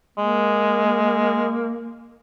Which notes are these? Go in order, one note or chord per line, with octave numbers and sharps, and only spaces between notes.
G#3 A#3